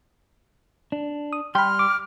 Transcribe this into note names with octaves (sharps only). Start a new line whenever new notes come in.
D4
D#6
G3 G5 B5 C6 F6
D6